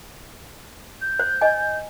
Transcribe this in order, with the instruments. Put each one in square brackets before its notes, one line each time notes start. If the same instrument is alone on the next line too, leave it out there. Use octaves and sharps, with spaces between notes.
[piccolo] G6
[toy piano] C5
D#5 G#5